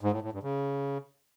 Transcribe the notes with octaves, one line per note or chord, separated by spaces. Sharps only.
G#2
A2
A2
G2
C#3